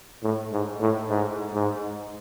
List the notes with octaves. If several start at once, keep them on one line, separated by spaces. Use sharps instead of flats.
A2
G#2
A2
G#2
G#2